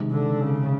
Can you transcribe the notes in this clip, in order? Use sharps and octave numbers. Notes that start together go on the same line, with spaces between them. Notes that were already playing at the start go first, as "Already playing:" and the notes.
Already playing: C3 D#3 G#3
D3
C#3